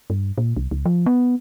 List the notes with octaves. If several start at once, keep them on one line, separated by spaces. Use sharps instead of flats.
G2
A#2
C2
C#2
F3
B3